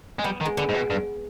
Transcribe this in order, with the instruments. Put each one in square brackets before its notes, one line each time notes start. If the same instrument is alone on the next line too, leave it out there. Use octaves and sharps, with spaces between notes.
[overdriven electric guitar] G#3
[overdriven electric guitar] G3 [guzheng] B3
[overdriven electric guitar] D#3
[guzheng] G#3
[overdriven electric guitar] D3 [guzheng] B3
[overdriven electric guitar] G#2
B2
G2